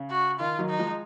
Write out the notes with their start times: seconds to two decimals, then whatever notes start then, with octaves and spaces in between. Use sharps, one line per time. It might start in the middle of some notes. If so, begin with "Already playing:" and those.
Already playing: C#3
0.10 F#4
0.40 D#3 F4
0.59 D#3 F#3
0.69 D#4
0.79 F3 G#3